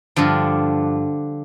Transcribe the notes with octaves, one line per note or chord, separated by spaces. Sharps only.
G2 D3 F3